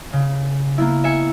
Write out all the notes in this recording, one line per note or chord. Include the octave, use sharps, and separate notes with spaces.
C#3
A#3 B3 E4
E5 G#5 C#7